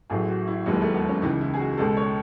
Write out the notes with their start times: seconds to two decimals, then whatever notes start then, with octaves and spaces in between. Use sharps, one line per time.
0.10 A1 A2 F#3 G#4
0.28 F#4
0.47 E4
0.66 E1 D#2 D#3 F#3 G#3
0.81 A3
0.94 B3
1.08 C#4
1.22 C#2 C#3 E3 D#4
1.41 E4
1.54 G#4
1.59 F#4
1.78 C#2 B2 G#3 A4
1.97 C#5